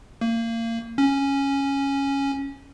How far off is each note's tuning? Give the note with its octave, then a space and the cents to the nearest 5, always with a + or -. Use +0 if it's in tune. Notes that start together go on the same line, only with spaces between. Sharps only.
A#3 -30
C#4 -5